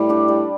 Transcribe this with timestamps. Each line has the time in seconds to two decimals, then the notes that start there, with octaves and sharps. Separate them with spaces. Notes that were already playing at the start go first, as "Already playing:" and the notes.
Already playing: A2 G3
0.09 D4 G4
0.28 G3